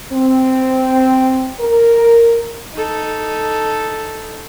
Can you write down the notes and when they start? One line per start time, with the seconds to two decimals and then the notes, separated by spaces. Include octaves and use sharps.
0.12 C4
1.60 A#4
2.74 D#4 A4